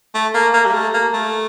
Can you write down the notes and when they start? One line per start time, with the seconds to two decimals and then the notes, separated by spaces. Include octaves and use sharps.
0.15 A3
0.35 A#3
0.54 A#3
0.66 G3
0.74 A3
0.94 A#3
1.13 A3